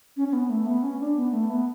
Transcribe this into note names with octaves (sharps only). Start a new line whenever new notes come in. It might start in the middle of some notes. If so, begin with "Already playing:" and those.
C#4
C#4
B3
A3
B3
C#4
D4
B3
A3
B3